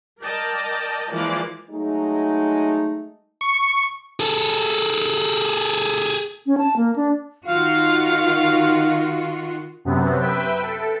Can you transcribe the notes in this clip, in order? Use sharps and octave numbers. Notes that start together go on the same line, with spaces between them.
A#4 D5 D#5 G5 A5
E3 F3 G#3 A#3 D5
F#3 G#3 A3 D#4
C#6
G#4 A4
C#4
A5
A#3
D4
D#3 F4 F#4 F5
F#2 C3 B3 C4
B4 E5 G5
A4